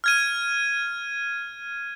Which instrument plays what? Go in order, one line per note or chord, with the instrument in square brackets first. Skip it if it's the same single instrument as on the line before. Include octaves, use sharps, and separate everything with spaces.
[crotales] F6 G#6 D#7